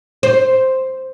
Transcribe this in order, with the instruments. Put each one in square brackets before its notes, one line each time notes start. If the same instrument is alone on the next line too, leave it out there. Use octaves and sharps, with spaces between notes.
[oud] C5